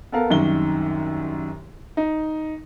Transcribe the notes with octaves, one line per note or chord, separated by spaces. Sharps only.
B3 A4 A#4 F5
C2 F#2 D#3 G7
D#4